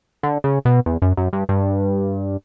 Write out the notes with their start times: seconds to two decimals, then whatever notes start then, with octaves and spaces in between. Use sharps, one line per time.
0.23 D3
0.44 C#3
0.65 B2
0.86 E2
1.02 F#2
1.17 F#2
1.33 G2
1.49 G2